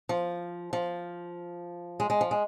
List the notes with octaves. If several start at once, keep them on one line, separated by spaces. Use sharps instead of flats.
F3
F3
G#3
G#3
F3
G#3